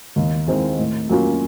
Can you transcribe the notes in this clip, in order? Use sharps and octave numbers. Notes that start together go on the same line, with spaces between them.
D#2
D#3 G#3 C4 E4
A2
F#3 A#3 C#4 F4